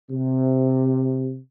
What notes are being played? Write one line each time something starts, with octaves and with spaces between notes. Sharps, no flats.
C3